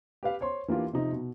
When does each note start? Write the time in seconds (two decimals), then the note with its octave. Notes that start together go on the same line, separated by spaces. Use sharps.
0.23 G4 B4 F5
0.41 C5 C#5 C6
0.68 E3 A#3 D4 F4 G4
0.93 C3 F3 D#4
1.12 B2